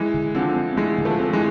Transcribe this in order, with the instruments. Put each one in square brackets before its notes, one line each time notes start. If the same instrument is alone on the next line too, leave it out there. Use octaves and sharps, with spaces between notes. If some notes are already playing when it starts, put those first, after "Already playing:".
Already playing: [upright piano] E3 G#3
[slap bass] D3
[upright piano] D3 F3 [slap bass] C4
[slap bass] C4
[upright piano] E3 G#3 [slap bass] A3
[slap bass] D3
[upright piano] F3 A3
[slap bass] C4
[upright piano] E3 G#3